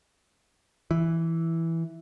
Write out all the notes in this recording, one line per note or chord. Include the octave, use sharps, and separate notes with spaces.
E3